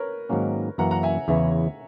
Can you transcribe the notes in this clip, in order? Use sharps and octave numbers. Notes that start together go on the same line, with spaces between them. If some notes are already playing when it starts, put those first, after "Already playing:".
Already playing: A#4 B4 C#5
G#2 D#3 F#3 A#3 C#4
F#2 E3 A#3 C#4 F#5 A#5
F#5 A#5
E5 G#5
E2 C#3 E3 C#5 E5